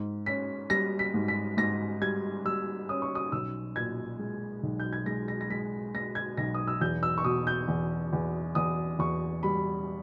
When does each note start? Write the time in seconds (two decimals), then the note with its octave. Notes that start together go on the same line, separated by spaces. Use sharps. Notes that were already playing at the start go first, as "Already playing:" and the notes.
Already playing: G#2
0.26 C#4 B6
0.70 G3 A#6
0.99 B6
1.14 G#2
1.28 B6
1.57 G#2 A#6
2.01 G3 G#6
2.45 G3 E6
2.89 C#4 D#6
3.02 C#6
3.15 D#6
3.32 B1 E6
3.76 A#2 G#6
4.19 G#3
4.63 B1
4.80 G6
4.93 G#6
5.06 G#3 A#6
5.28 A#6
5.41 A#6
5.50 G#3 B6
5.94 G#3 A#6
6.15 G#6
6.37 B1 A#6
6.54 D#6
6.68 E6
6.81 E2 G6
7.03 E6
7.18 C#6
7.24 B2 D#6
7.47 G6
7.68 E2
8.13 E2
8.55 E2 D#6
8.99 E2 C#6
9.43 G3 B5